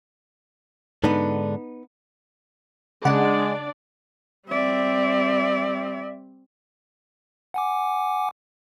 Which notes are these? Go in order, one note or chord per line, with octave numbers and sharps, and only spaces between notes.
G#2 D3 B3 D4 D#4
C#3 G#3 D4 D5 F#5
G3 C4 D5 E5
F#5 G#5 D6